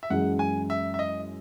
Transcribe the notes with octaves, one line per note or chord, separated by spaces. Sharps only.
E5
F#2 E3 G#3 F#5
G#5
E5
E5
D#5